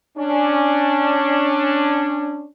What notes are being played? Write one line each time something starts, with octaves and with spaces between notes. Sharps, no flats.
C#4 D4